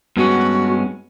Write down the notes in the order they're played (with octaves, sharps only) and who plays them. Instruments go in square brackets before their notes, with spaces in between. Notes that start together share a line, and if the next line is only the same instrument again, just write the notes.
[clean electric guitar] G2 G#3 C#4 [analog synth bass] B3 [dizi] F#4